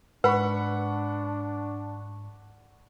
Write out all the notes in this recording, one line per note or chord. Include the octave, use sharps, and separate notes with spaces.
G#2 D4 B4 F#5 B5 C#6